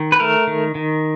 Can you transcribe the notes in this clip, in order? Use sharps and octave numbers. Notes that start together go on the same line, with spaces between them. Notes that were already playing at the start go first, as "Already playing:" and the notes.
Already playing: D#3
B4
A3 A#4
D#3
D#3